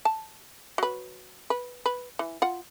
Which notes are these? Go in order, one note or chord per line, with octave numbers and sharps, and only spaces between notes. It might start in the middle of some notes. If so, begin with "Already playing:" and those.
A5
F#3 B4
B4
B4
E3
F4 F#5